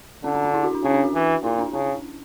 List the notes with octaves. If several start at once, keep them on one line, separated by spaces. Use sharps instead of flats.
D3 C#4
D4
D4
E4
F#4
D4
C#3 C#4
D4
F#4
E3
A#2 E4
D4
C#3 C#4